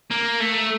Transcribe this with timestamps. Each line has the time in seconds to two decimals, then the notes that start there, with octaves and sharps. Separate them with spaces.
0.11 A#3
0.40 A3